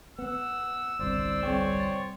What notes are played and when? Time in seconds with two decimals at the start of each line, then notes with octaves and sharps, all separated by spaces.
0.19 B3 F#5 E6
0.99 G1 C2 C5 D5
1.43 G3 C4 C#5 G5
1.80 C6 A6